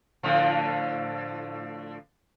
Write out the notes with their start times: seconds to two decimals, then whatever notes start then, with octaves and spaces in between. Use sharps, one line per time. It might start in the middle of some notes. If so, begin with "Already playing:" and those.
0.23 A2 D3 F3